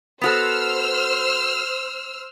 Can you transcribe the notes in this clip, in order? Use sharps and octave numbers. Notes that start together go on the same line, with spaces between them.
B3 F#4 A4 C5 E6 F6